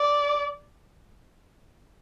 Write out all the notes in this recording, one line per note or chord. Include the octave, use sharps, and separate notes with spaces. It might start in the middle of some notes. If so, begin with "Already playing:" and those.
Already playing: D5